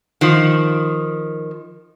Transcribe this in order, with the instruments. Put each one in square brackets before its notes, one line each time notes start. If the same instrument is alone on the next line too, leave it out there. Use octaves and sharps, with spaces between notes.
[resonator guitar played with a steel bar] D#3 F3